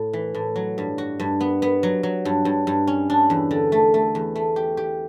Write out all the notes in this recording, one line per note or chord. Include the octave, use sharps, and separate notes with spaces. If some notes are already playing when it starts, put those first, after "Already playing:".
Already playing: A2
E3
A2
F#3
G2
F#4
G2
B3
B3
F#3
F#3
G2
G2
G2
C#4
D4
E2
D3
A3
A3
E2
A3
G4
G4